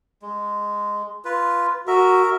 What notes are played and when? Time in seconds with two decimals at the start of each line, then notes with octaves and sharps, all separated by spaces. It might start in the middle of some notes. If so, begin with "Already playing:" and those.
0.22 G#3
1.25 F4 B4
1.87 F#4 A#4 E5